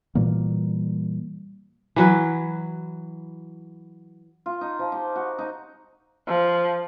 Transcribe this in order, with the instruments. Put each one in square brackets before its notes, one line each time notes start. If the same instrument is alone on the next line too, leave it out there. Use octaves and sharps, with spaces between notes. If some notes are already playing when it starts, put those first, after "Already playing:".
[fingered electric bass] A#2 E3 G3 A#3
[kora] E3 F#3 B4
[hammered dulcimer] F4
D#4
F3
G4
F#4
D#4
[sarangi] F3